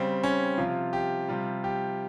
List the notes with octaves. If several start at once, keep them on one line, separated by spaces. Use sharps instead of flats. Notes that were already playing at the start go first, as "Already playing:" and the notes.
Already playing: C#3 G3 C4
C#4
C3 F3 F4
G4
C3 G3 F4
G4